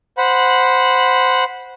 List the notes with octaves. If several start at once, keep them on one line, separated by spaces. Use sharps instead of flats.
C5 F#5 B5